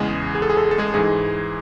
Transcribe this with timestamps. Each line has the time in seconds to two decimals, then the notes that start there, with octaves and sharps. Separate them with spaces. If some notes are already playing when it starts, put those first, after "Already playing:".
Already playing: E2 C#3 E3 G#3 G#4
0.35 G#4
0.42 A4
0.50 G#4
0.57 A4
0.64 G#4
0.71 A4
0.78 G#3 G#4
0.94 G#2 E3 G#3 G#4